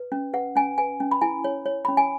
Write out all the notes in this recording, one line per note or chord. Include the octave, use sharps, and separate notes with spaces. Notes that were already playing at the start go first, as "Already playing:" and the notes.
Already playing: B4
C#4
B4 F#5
C#4 G#5
B4 G#5
C#4
B5
E4 G#5
C#5
C#5
C#4 B5
G#5